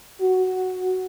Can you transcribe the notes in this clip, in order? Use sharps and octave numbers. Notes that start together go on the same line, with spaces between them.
F#4